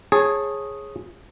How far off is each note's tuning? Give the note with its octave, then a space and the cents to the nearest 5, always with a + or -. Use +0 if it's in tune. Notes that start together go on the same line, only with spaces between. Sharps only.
G#4 +0 C#5 -20 A5 +0